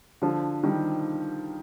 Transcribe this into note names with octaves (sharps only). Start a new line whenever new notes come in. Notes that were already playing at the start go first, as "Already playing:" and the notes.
D3 F3
D#3 G3